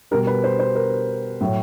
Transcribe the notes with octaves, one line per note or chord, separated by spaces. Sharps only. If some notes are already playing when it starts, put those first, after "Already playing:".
B2 G3 A#4
B4
C5
C5
A#4
A2 F#3